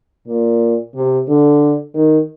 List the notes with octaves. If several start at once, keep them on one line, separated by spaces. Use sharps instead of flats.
A#2
C3
D3
D#3